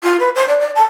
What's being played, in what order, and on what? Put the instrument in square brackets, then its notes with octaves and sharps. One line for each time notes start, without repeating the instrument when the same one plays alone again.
[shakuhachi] F4
B4
C5
D5
D5
A5